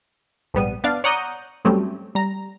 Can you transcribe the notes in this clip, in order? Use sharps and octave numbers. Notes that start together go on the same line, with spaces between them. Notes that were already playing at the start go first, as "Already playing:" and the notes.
A#1 G#2 G3 B3 D#7
B3 D4 D5 F5
C#5 D5 F#5 A#5 D#6 G6
G2 F#3 G3 A3 C4 C#4
G3 A#5